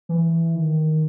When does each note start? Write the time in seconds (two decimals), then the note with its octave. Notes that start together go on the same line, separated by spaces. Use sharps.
0.09 E3
0.55 D#3